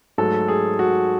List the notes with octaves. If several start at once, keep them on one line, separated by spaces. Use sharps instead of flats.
G#2 F#3 A3 A4
G#4
F#4